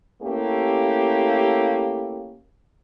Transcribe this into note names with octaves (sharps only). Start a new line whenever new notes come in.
A3 A#3 C#4 E4 G4